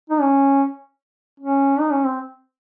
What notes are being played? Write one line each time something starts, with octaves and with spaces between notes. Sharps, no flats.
D#4
C#4
C#4
D#4
C#4
C4